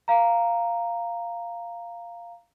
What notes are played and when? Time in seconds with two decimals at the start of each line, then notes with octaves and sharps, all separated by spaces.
0.08 F5 A#5